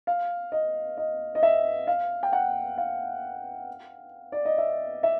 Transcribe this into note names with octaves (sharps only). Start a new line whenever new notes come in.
F5
D#5
D#5
D#5
E5
F5
G5
F#5
F5
D5
D#5
E5
E5